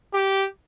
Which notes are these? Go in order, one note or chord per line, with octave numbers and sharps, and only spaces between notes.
G4